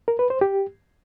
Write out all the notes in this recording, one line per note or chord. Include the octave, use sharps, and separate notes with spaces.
A#4
B4
C5
G4